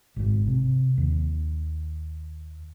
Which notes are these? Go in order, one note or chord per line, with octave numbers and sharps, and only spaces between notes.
G#1 G#2
C3
D#2